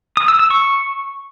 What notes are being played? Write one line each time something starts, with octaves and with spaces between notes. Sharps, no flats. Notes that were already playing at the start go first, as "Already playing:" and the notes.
D#6
E6
E6
C#6